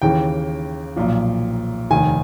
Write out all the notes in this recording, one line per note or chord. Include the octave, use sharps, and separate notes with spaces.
D#2 C#3 E3 G5
B1 A#2 F3
F1 D#2 D#3 G#5